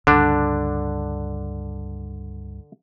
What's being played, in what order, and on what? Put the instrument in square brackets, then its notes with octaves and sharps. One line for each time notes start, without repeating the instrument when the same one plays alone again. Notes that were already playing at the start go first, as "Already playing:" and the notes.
[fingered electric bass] C#2 G2 [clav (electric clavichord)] D3 D4